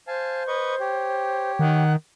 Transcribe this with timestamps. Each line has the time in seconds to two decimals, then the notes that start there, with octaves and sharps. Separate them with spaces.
0.08 C5 F5 G#5 A5
0.47 B4 D#5 C#6
0.80 G4 C#5
1.59 D#3 F#5